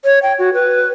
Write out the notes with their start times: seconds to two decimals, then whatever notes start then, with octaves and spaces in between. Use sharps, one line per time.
0.05 C#5
0.23 G5
0.39 F#4
0.54 B4